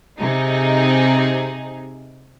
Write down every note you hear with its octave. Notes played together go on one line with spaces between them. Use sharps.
C3 D#4 G#4